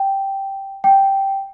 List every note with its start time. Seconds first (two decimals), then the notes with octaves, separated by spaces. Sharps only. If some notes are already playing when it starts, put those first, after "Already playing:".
Already playing: G5
0.84 G5